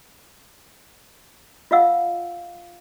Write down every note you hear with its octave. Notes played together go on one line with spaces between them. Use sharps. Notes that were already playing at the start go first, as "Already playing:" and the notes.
F4 D#5 F5 F#5 E6